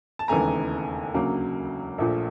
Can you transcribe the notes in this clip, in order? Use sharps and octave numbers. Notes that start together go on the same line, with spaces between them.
A5
E1 D#2 C#3 E3 A3 G#5 A#5
D2 C#3 F#3 A#3
A#1 A#2 F3 A3